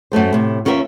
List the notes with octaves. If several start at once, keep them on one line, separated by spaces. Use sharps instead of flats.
F#2 A#2 A3 C5
A2 C3
D#2 C#4 F4 A#4 E5